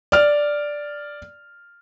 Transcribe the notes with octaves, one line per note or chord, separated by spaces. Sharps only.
D5 F6